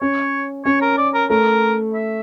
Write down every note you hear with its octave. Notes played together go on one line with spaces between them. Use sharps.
C#4 C#5
C#4 C#5
A#4
D5
A#4
A3 A#4
E5